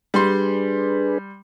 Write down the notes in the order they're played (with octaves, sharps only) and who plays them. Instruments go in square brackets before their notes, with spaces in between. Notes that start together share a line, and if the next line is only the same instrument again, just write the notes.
[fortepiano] G3 C6 [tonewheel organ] D4 G#4 B4